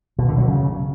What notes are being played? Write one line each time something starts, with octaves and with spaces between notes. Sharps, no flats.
B2
D3
F#3
C#3